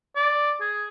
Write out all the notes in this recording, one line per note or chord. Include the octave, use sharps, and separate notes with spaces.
D5
G#4